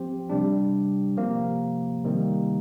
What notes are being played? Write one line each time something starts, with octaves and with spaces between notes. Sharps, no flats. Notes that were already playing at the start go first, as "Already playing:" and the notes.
Already playing: F3 C4 G4
C3 G3 D4
C3 F3 A#3
C3 D#3 G3 A#3